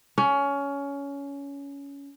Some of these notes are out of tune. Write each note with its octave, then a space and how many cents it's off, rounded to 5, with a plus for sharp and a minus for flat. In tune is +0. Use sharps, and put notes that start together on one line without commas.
C#4 +20